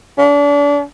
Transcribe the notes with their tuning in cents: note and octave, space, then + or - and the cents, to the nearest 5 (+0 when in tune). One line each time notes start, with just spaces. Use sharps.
D4 -35